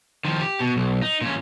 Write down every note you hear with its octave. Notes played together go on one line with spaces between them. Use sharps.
D#3 F3
G4
B2
B1
D#4
A#2 C#4